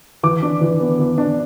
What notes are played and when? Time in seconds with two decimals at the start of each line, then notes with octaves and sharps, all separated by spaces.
0.23 E3 D6
0.43 D4
0.61 E3
0.80 B3
0.99 E3
1.18 D4